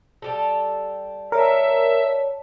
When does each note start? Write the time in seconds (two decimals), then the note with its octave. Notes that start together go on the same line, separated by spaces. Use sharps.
0.22 G3 G4 A4
1.32 A#4 C#5 D5 E5 A5